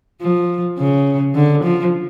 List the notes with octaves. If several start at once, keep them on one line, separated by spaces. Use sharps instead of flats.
F3
C#3
D3
F3